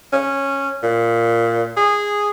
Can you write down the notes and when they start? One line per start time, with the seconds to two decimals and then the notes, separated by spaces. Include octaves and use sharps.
0.13 C#4
0.83 A#2
1.77 G#4